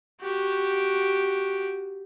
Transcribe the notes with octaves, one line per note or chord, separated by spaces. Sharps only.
F#4 G4